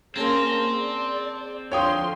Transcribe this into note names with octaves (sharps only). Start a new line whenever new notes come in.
A#3 C4 C#4 G#4 A5 A#5 C6
D5
D3 F3 C#5 F5 G5 C6 D#6